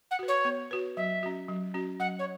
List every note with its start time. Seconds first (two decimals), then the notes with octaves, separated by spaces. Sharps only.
0.11 F#5
0.19 F#4 B4
0.28 C#5
0.45 B3
0.71 F#4 B4
0.97 F#3 E5
1.23 C#4 F#4
1.48 F#3
1.74 C#4 F#4
2.00 F#3 F#5
2.19 C#5